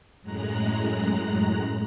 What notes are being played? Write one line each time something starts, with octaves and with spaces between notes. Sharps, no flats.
F#2 A2 G#3 A#5 F#6